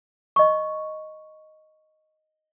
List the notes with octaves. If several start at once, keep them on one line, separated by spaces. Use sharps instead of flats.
D#5 C#6